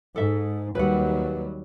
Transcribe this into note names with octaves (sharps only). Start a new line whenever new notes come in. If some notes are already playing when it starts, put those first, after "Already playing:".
G#2 A4 E5
D#2 F#3 G3 B4 F#5